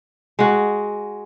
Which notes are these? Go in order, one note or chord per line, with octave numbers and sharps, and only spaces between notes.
G#3 F#4